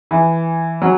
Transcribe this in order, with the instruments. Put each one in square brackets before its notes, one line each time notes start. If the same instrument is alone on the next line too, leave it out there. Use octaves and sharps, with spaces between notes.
[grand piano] E3
F#3